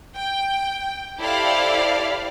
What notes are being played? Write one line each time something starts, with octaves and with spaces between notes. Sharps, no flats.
G5
E4 G4 A4 C5 D5 F5